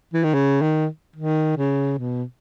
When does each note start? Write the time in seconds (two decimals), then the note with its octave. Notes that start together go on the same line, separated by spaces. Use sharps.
0.14 E3
0.24 D#3
0.34 C#3
0.61 D#3
1.16 D#3
1.57 C#3
1.99 B2